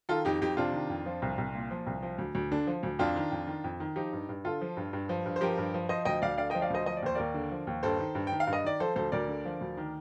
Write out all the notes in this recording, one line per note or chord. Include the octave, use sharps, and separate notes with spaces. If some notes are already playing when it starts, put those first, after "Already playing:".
D#3 F4 A4
F2 D#4 G4
F2 D#4 G4
C3 D4 F4
D#3
F2
F3
C2
C2
A#2
F3
C2
F3
D2
D2
D3 D4
F3
D2
F2 D4 F4
D#3
F2
D#3
F2
D#3
F3 D#4 G4
G2
G2
D3 F4 A4
F3
G2
G2
F3
G2
C5
F3 G4 A#4
G2
F3
F3 C5 D#5
D2 D#5 G5
D2 D5 F5
D3 D5 F5
D#5 G5
F3
D5 F5
D2 C5 D#5
F3 D#5
D5
D#2 C5
D#2 A#4 D5
D3
F3
D#2
G2 A4 C5
D#3
G2
G5
D#3
F5
G2
D#5
D#3 D5
F3 A4 C5
D2 A4 C5
D2 A#4 D5
D3
F3
D2
D#3